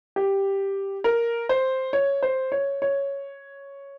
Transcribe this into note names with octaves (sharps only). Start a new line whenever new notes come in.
G4
A#4
C5
C#5
C5
C#5
C#5